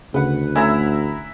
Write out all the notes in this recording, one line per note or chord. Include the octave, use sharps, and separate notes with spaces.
D2 C#3 B4 F#5
A3 C#4 E4 A#5 E6